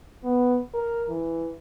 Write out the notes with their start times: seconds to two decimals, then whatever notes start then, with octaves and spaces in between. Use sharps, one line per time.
0.24 B3
0.74 A#4
1.09 E3